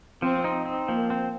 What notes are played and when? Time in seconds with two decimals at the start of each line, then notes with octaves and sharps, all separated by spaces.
0.22 F3 C4
0.44 D#4
0.66 C4
0.87 F3 A#3
1.10 C4